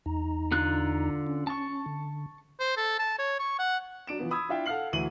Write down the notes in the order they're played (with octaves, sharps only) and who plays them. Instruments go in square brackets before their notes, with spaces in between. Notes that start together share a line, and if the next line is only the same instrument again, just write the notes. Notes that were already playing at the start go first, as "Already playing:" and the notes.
[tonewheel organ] E2 D#4 A#5
[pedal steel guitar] D3 F4 F#6
[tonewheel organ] C#4
[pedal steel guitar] A5 C#6
[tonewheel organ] D3
[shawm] C5
A4
A5
C#5
C#6
F#5
[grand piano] F#3 D4 D7 E7
E3 F3 B3
B5 D#6 E6 G#6
D4 E4 F4 E5 F5 G5
A4 F5 F#5 F6 C7 F#7
D2 E3 F#3 D#7 F#7